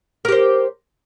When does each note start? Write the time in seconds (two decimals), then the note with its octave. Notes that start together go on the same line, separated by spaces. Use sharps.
0.25 A#4
0.28 G4
0.32 C5